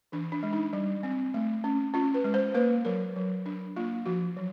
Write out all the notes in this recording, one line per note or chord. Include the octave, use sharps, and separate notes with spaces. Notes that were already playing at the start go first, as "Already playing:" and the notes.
E3 D4
D4
G#3
D#4
G3
C4
A3
C#4
C#4 F4
B4
G#3
C5
A#3 B4
F#3 A#4
F#3
D4
A#3 F4
F3 F#4
F#3